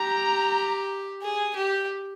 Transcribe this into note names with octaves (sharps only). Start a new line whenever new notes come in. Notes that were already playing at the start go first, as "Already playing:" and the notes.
Already playing: G4 A#5
G#4
G4